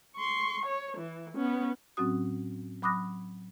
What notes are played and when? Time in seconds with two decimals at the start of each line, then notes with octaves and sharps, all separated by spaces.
0.17 C6 C#6
0.66 C#5
0.97 E3
1.36 B3 C#4
1.97 A2 F#3 C4 C#4 F#4 D#6
2.82 F#3 B5 D6 D#6 F#6 A#6